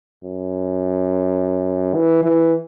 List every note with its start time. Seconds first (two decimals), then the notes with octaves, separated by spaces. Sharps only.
0.23 F#2
1.94 E3
2.24 E3